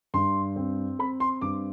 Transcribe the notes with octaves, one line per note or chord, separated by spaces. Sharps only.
G2 C6
C4
C4 B5
C6
G2 D6